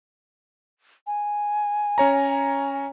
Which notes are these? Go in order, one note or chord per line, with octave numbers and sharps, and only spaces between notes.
G#5
C#4 C#5 A#5